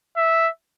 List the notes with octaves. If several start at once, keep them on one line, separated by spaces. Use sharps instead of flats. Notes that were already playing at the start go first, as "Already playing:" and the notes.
E5